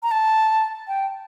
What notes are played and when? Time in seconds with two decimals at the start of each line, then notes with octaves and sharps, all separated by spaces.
0.03 A#5
0.11 A5
0.88 G5